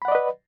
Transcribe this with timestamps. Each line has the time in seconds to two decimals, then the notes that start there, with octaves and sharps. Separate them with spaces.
0.02 B5
0.05 F#5
0.08 D5
0.12 D#5
0.15 B4